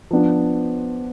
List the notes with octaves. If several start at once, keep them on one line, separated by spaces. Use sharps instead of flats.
F3 B3 D4